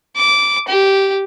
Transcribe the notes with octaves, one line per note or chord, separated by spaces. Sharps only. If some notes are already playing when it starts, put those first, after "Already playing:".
D6
G4